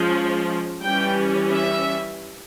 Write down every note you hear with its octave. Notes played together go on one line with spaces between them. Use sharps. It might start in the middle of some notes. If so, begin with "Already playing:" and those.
Already playing: F3 G#3 C#4
E3 G3 C#4 G5
E5